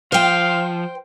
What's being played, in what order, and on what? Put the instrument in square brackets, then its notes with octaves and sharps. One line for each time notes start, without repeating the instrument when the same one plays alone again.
[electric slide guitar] F3 [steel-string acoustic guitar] C5 G5 [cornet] F5